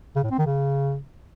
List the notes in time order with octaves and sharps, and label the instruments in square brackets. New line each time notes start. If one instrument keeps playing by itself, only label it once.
[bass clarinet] C#3
A2
C4
D#3
C#3